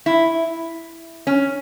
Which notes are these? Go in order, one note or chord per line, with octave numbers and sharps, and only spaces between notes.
E4
C#4